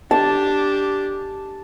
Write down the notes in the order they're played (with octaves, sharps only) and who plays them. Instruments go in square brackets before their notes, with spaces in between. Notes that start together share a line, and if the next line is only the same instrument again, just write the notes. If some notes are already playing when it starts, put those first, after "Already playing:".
[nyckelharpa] D4 G4 [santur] A5